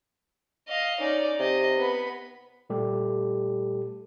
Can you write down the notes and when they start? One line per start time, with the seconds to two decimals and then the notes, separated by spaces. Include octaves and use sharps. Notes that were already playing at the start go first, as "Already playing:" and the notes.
0.68 D#5 F5
1.00 C#4 D#4 D5
1.39 C3 D#5
1.77 B3 B5
2.70 A#2 G3 A3 G4 A4